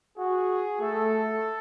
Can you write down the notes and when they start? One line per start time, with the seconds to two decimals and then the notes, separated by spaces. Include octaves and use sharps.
0.17 F#4 G#4
0.81 A3 A4